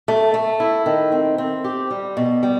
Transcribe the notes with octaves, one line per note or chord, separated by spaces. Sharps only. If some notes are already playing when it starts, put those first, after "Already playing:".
A3
A3
E4
D#3
C4
C4
G4
G3
B2
G3